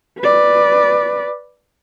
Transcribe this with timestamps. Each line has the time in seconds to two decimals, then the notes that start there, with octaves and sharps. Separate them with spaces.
0.19 B4 D5